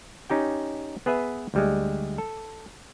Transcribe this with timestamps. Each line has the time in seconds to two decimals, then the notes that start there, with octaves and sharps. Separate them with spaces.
0.30 C#4 D#4 G4 G5
1.06 B3 G#4 B4 E5
1.54 D2 G3 G#3
2.18 A4